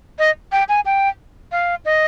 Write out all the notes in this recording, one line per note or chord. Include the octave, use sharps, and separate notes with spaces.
D#5
G5
G#5
G5
F5
D#5